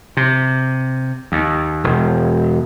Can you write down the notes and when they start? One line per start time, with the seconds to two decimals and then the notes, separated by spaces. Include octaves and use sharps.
0.17 C3
1.32 D#2
1.84 E1